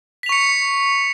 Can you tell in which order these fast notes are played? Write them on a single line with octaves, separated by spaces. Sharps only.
B6 F7 C#6 C#7